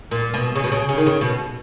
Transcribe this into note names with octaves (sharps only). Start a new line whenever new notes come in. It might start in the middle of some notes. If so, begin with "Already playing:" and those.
A#2
B2
C#3
B2
C#3
C#3
D#3
C#3
B2